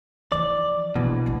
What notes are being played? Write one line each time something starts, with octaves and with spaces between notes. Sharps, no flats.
E3 F3 D5
A#1 B2 E3
A1 D2